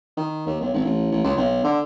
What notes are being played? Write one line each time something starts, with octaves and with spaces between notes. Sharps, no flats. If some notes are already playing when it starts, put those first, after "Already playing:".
D#3
D#2
B1
G#1
A1
A1
C#2
B1
D3